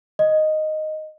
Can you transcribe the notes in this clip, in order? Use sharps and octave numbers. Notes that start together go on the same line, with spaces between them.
D#5